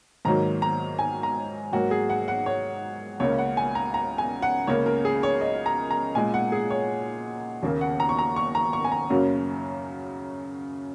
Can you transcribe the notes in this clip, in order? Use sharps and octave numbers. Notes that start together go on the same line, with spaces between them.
G#2 D#3 F#3 A#3 A#5
A#5
G#5
A#5
G#2 F#3 A#3 F#4
G#4
F#5
F#5
C#5
C#2 C#3 A#3 C#5
F#5
G#5
A#5
A#5
G#5
F#5
C#2 C#3 A#3 C#5
A#4
G#4
C#5
D#5
A#5
A#5
A#2 G#3 G#5
F#5
G#4
C#5
D#2 C#3 A#3
F#5
A#5
C#6
A#5
C#6
A#5
C#6
G#5
A#5
F#2 C#3 F#3 A#3